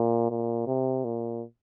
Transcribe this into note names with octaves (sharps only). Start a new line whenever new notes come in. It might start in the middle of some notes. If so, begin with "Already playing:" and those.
Already playing: A#2
A#2
C3
A#2